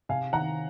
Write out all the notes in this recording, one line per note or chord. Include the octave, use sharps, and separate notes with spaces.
C3 F5 G#5
D#3 F#5 A#5